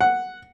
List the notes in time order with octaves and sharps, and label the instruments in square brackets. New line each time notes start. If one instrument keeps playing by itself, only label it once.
[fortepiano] F#5